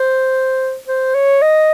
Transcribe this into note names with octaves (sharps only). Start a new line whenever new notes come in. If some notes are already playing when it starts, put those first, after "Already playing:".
Already playing: C5
C5
C#5
D#5